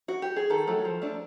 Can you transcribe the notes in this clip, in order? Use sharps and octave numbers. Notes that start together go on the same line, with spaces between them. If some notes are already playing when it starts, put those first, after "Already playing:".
F#4
G4
G#4
D#3 A4
F#3 A3
F3
A3 D4